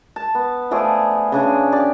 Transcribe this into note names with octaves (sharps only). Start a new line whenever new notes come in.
A5
B3
F3 A3 G#4 D5
C#3 D4 G#4
G4 D5